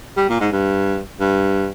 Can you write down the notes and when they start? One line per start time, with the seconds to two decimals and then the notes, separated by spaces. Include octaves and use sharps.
0.17 G3
0.29 A#2
0.40 G#2
0.52 G2
1.20 G2